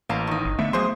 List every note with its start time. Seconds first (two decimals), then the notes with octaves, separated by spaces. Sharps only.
0.09 A1 A#3 F5 A5 A#5
0.27 D#3 D#4
0.45 G1
0.59 D3 A3 B3 E5
0.73 F2 F#3 G#3 G#4 C5 C6